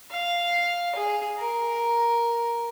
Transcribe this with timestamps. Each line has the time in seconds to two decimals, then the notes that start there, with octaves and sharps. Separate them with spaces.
0.11 F5
0.95 G#4
1.39 A#4